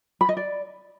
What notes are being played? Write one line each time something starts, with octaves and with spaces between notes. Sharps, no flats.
B5
D#5
D5